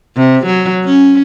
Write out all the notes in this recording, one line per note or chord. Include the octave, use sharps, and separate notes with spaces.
C3
F#3
C#4